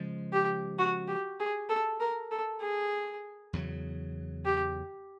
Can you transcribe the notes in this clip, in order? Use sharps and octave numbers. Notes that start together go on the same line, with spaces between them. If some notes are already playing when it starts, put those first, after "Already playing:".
Already playing: C#3 F3 G#3
G4
F#4
G4
G#4
A4
A#4
A4
G#4
E2 C#3 F#3
G4